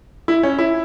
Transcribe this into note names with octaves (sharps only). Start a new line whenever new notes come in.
E4
C#4
E4